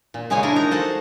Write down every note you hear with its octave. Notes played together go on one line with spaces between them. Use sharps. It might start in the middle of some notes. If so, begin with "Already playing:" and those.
A#2
C#3 G#3 A#3 G#4 C#5 G#5
D4 E4 A#4
D#4 A#5
F#4 A4 C5 F#5